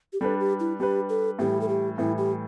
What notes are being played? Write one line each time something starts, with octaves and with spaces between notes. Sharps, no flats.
G4
G3 D4 A4 B4
G4
E4
G3 D4 G4 B4
A4
A2 E3 G3 G4
A4
G4
A2 E3 G3 E4
G4